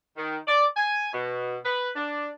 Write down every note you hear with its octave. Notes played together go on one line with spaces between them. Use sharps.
D#3
D5
G#5
B2
B4
D4